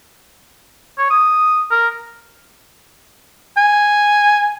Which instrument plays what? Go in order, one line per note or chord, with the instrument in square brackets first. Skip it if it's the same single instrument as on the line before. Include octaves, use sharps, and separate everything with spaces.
[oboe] C#5
D#6
A#4
[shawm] G#5